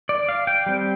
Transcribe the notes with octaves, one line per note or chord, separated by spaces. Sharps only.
D5
F5
G5
G3 C4